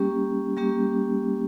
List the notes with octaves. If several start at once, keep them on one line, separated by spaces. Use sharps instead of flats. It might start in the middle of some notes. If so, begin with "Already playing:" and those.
Already playing: G3 A#3 C#4 G4
G3 A#3 C#4 G4